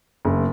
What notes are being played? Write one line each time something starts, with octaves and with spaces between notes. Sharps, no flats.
F#1